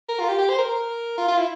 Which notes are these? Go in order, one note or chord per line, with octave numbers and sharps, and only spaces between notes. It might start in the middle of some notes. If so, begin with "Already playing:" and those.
A#4
F4
G4
G4
C5
A#4
A#4
F4
F4
E4